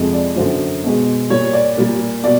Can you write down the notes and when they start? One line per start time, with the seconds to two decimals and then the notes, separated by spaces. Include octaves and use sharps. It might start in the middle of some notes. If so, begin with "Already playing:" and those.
Already playing: F2 C3 F3 G#3
0.13 D5
0.36 F#2 D3 F#3 C5
0.84 B2 G#3
1.30 A#2 G3 C#5
1.53 D5
1.77 A#2 G3
2.24 B2 D5